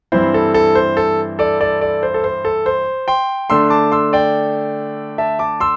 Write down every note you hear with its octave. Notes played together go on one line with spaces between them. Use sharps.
G2 E3 C4 E4 C5
A4
A4
C5
A4
A4 D5
A4 D5
A4 D5
C5
A4
C5
A4
C5
G5 C6
D3 A3 D4 C6 E6
A5 D6
C6 E6
D5 G5
E5 A5
A5 D6
C6 E6